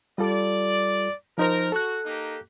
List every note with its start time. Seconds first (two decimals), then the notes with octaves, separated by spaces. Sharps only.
0.18 G3 F4 A4 D5
1.38 F3 D#4 A#4 C5
1.72 F#4 A4 F#6
2.04 A#3 D#4 G4